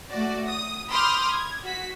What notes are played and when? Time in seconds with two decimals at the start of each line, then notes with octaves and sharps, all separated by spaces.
0.11 A3 F#4 D5
0.47 D#6
0.90 B5 C6 D6 D#6 F6 G6
1.31 G#6
1.64 F#4 B6